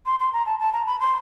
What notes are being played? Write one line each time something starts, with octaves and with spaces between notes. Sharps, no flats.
C6
C6
A#5
A5
A5
A#5
B5
C6